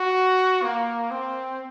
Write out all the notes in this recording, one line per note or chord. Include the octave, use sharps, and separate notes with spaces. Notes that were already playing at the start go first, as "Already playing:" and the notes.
Already playing: F#4
A#3
C4